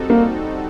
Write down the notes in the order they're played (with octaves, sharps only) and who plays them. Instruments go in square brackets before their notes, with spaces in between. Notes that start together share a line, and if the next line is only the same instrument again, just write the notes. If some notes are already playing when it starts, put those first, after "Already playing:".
Already playing: [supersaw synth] G3 C4 D#4 F#4 A4
[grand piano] A#3